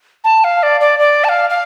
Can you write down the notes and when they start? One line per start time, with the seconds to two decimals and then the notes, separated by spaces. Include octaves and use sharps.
0.24 A5
0.44 F5
0.63 D5
0.81 D5
0.99 D5
1.24 A5
1.29 F5
1.50 F5